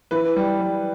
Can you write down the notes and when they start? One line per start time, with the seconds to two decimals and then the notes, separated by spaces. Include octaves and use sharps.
0.11 E3 B4
0.36 G3
0.61 G3